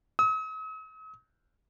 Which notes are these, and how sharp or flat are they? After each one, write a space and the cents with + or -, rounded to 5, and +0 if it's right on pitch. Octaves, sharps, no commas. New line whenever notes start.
D#6 +45